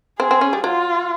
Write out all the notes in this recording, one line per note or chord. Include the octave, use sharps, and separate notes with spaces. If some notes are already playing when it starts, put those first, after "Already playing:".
C4 G#4
C4
C#4
G3
F#3 F4